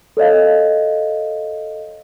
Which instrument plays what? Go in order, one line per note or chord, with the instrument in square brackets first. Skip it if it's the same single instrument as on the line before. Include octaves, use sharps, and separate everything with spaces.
[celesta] A4 C#5 D#5 F5